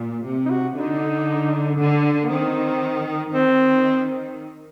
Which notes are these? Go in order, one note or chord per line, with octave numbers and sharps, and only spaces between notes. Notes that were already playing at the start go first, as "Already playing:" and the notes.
Already playing: A#2
C3
D#4
F#4
D3 D#4
D3
A#3
D#3 C4
D#3 C4